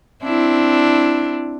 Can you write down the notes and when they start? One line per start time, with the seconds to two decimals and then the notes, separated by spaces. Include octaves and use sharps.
0.24 C4 D4 E4